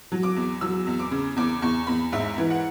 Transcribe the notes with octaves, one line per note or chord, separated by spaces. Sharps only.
F#3
D6
E2
F#3 E6
E2
D6
C#3
E2 D6
E2 C#6
E2 B5
G#2 E5
E3
F#5